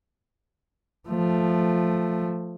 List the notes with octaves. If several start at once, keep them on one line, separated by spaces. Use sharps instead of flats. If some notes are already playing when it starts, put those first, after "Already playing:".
F3 A3